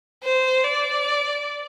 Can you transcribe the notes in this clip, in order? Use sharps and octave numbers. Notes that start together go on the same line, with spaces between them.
C5
D5